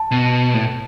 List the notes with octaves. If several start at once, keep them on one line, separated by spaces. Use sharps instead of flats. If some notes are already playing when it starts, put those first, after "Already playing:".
Already playing: A5
B2
A2